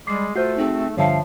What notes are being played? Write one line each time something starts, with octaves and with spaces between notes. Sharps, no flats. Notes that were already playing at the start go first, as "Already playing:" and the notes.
G3 G#3 D6 C7
A3 F4 F#4 C5 G6 C7
C4 D#4 G#4
G2 D3 F3 C#5 E5 F5 A5